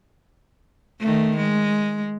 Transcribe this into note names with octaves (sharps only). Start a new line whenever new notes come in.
D#3 A3
G#3